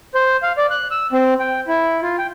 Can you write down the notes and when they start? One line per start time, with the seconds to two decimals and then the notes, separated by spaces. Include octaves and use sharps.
0.15 C5
0.43 F5
0.57 D5
0.71 F#6
0.91 E6
1.12 C4
1.39 G5
1.68 E4
2.02 F4
2.18 G5